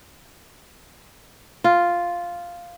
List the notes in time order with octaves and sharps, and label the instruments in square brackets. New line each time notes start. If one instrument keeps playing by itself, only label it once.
[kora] F4